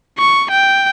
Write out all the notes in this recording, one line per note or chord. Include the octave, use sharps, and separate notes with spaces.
C#6
G5